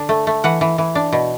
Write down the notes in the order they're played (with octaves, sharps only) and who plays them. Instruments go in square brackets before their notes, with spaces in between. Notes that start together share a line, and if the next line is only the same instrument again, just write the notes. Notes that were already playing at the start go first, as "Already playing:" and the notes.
Already playing: [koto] D3 D4
A3
A3
E3 F#5
E3
E3
D4
B2